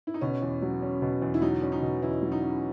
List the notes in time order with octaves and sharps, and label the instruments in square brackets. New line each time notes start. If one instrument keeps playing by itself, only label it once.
[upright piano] E4
D#4
[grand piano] B2 [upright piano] C#4
[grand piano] E2
F#3
C#4
B2
E2
[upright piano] E4
[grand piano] F#3 [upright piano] D#4
[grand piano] C#4
[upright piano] D#4
[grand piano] B2
[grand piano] E2 [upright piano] E4
[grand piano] F#3
[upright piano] D#4
[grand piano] C#4